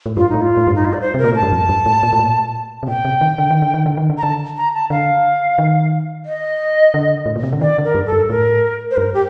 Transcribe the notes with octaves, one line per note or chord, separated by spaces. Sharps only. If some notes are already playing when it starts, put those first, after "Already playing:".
A2
G2 F4
A2 D#4
F4
A2
G2
D#4
F4
D5
C5
C3 A#4
A#2
A2 A5
G2
F2
G2
A2
A#2
A2
A#2
C3
A#2 G5
C3
D#3
D3
D#3
D3
D#3
D3
D#3
D3
A#5
D3 A5
A#5
A5
D3 F5
D#3
D#5
D3
A2
A#2
C3
D3
D#3 D5
D3
A#4
G2
A4
G2
A2 A#4
C5
G2 A#4
G4